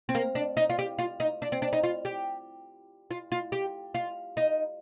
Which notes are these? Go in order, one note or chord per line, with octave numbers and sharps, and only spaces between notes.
C4
A#3
D4
D#4
F4
G4
F4
D#4
D4
C4
D4
D#4
F4
G4
F4
F4
G4
F4
D#4